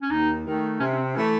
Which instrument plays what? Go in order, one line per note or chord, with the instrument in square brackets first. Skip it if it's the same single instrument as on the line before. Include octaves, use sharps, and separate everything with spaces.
[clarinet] C#4
[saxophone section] D#2 [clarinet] D#4
[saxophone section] D#3 A3
[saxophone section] C3 [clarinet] C#4
[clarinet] C#4
C4
[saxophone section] E3 A3 [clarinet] C#4